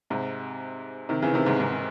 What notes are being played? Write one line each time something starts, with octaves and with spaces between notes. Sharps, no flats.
G#2 C3
C3 D#3
C#3 E3
C3 D#3
G#2 C3
G#2 C3